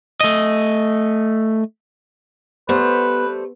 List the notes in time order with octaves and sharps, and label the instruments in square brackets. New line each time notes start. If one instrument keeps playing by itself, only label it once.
[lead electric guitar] A3 D#5
[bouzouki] G3 A3 C5 [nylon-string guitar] B3 [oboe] B4